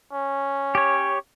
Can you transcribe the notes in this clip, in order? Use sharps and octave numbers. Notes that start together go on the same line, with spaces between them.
C#4
G4 C#5